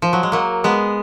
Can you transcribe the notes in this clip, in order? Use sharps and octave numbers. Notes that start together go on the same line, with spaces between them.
F3
F#3
G#3
F#3 A#3
G#3 B3